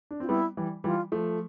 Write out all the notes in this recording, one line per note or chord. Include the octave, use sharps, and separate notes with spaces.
D4
C4 F4
G3 B3 E4
E3 G3
E3 G3 F4
F3 A3